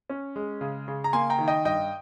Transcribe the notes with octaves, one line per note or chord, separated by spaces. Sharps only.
C#4
G#3
C#3
C#3
A#5
A#3 G#5 C6
G5 A#5
D#3
D#5 G5
G2 D#5 G5